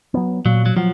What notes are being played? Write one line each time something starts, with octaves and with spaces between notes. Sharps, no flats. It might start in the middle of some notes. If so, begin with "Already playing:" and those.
F#3 B3
A#2 F#3
F#3
F3 F#3